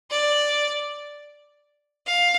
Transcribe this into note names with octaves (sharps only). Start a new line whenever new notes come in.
D5
F5